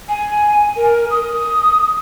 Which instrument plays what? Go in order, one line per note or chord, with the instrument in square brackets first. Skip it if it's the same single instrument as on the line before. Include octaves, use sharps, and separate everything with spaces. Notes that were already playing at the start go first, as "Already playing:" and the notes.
[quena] G#5
A#4
D#6